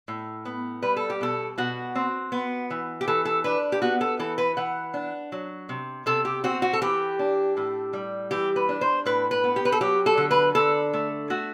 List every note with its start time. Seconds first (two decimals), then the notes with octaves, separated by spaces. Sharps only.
0.08 A2
0.45 B3
0.82 G3 B4
0.96 A4
1.10 G4
1.21 B2 A4
1.58 B2 F#4
1.95 C4
2.32 B3
2.70 E3
3.01 G4
3.08 E3 A4
3.25 A4
3.44 D4 B4
3.72 G4
3.82 B3 F#4
4.01 A4
4.19 E3 A4
4.38 B4
4.57 E3 F#5
4.94 D4
5.32 F#3
5.69 C3
6.06 C3 A4
6.25 G4
6.44 C4 F#4
6.62 F#4
6.73 A4
6.82 E3 G4
7.19 D4
7.57 A2
7.93 G3
8.31 E3 G4
8.56 B4
8.69 D4
8.81 C5
9.06 A2 B4
9.31 B4
9.44 B3
9.56 G4
9.65 B4
9.72 A4
9.81 F#3 G4
10.06 A4
10.17 D3
10.31 B4
10.55 D3 A4
10.93 A3
11.30 A3 F#4